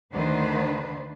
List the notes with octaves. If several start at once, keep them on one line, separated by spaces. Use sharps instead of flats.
D2 D3 D#3 D4 B4 C5